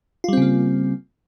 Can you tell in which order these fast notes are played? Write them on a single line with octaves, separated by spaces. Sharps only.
F4 G3 C4 C#3 A#3